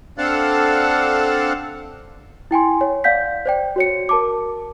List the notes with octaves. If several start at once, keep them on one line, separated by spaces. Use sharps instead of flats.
C4 D4 A4 F5 F#5 A5
E4 G5 G#5 C6
C#5
D5 F5 F#5 G6 B6
C5 D5 G5
F#4 C#5 C#7
A#4 A5 D6